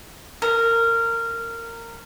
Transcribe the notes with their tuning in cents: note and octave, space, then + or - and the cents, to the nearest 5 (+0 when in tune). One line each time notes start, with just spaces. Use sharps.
A#4 -20